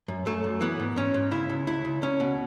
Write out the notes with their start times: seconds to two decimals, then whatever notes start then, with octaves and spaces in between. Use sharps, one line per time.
0.08 F#2
0.26 F#2 A3
0.44 F#2
0.61 E3 B3
0.80 G#2
0.96 G#2 C#4
1.14 G#2
1.31 C#3 E4
1.49 C#2
1.67 C#2 E4
1.85 C#2
2.02 C#2 C#4
2.20 B2